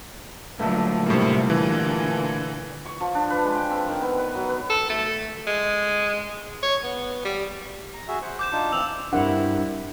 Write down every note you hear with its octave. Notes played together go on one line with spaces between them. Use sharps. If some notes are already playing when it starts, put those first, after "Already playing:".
G2 A#2 D3 F#3 A3
A2 C3 G3 A#3
D3 E3
C#6
F3
D4
B4
G#3
G5
C4
D#3
B3
B4
F#3
B4
A4
A3
G#3
C#5
B3
G3
A#5
F#4 G#4 E5
C5 F#5
D6 G6 E7
D4 D#4 F4
E3 C4 E6 F7
G2 G3 C4 D4 E4 A#4 F#5